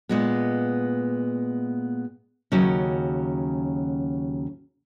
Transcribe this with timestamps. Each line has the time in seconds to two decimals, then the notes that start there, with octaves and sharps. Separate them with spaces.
0.09 A#2 G#3 B3
2.52 D#2 C#3 F#3 C#4